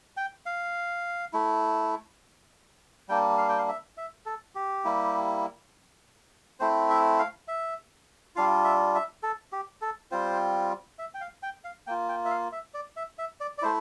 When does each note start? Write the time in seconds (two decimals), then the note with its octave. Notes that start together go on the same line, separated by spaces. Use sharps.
0.17 G5
0.46 F5
1.33 A3 E4
3.09 G3 A#3 D4 G5
3.38 F5
3.49 G5
3.58 F5
3.68 E5
3.97 E5
4.26 A4
4.55 G4
4.84 G3 A#3 E4
6.60 A3 C4 E4 C5
6.90 E5
7.19 F5
7.48 E5
8.36 G3 D4 F4 F5
8.65 E5
8.95 E5
9.23 A4
9.52 G4
9.82 A4
10.11 G3 C4 F4 C5
10.99 E5
11.14 G5
11.21 F5
11.43 G5
11.64 F5
11.87 A#3 F4 G5
12.09 G5
12.25 E5
12.31 F5
12.52 E5
12.74 D5
12.97 E5
13.19 E5
13.40 D5
13.58 D5
13.62 A3 E4 C5